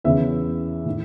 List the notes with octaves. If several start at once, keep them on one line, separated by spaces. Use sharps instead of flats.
E2 C#3 E3 E5
A2 E3